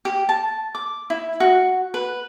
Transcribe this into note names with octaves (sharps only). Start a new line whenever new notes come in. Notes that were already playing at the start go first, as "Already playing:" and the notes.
G4
A5
D6
E4
F#4
B4